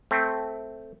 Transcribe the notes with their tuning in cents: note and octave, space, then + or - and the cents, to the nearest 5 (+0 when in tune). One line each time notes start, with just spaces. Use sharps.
A3 +0 C4 -5